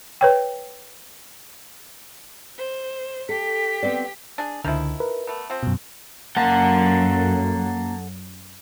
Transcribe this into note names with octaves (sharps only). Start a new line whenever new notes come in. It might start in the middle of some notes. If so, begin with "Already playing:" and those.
B4 C#5 G5
C5
G4 A4 B6
B3 C4 D5
D4 G#4
C#2 D3 D#3 F3 E4
A#4 B4
A3 B3
F3 C4
F#2 B2
F#2 F#3 A#3 A4 F#5